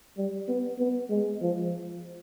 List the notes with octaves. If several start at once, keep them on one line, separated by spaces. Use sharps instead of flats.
G3
B3
B3
G#3
F3